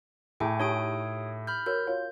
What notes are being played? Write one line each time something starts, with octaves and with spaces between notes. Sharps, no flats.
A2 E4 G#4 A4 G5 G#5
D#4 F4 G4 C#5 D#6 D7
B5 F6 G6
F#4 A#4 C#5 G6
F4 C#5